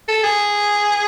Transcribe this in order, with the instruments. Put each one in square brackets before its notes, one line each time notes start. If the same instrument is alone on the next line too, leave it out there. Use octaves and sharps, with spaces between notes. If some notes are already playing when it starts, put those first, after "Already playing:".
[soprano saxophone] A4
G#4